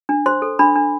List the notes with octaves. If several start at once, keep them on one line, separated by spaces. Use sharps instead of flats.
D4
C5 C6
A4
D4 B5
D4